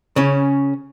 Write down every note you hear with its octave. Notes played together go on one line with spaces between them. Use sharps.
C#3 C#4